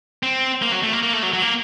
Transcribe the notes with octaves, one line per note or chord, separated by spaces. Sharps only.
C4
A#3
F#3
A3
A#3
A#3
A3
F#3
F#3
A#3